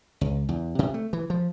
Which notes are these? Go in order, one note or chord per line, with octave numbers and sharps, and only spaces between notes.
C#2
E2
C3
A3
E3
F3